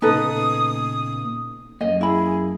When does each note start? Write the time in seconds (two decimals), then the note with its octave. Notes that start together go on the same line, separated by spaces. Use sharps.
0.02 A#2 C#3 B3 D#4 A4 B4 D#6
1.81 F#2 A#3 D#5
2.01 E4 G#4 B5